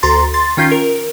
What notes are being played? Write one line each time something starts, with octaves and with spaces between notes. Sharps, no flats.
D2 A#5 C6 A6
C6 A6
D#3 C#4 F4 G6 C7
A#4